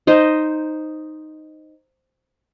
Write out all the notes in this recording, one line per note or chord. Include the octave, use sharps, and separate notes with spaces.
D#4 C5 D#5